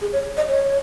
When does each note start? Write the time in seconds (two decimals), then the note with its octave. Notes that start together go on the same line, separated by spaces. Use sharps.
0.01 G#4
0.13 C#5
0.37 D#5
0.49 C#5